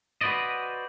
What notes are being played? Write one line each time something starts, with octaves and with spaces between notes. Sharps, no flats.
F#4 B4 C5 D5 D#5